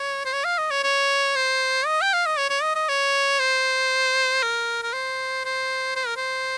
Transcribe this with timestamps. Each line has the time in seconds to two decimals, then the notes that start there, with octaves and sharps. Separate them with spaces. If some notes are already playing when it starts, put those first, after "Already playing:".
Already playing: C#5
0.25 C5
0.33 C#5
0.45 F5
0.58 D#5
0.71 C#5
0.83 C#5
1.35 C5
1.86 D#5
2.02 G5
2.13 F5
2.26 D#5
2.38 C#5
2.50 C#5
2.62 D#5
2.75 D#5
2.89 C#5
3.39 C5
4.43 A#4
4.83 A#4
4.93 C5
5.45 C5
5.96 C5
6.07 A#4
6.16 C5